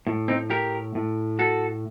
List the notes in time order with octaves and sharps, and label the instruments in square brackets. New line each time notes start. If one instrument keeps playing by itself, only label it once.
[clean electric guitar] A2
C4 D#4
G4 A#4
A2
F#4 A4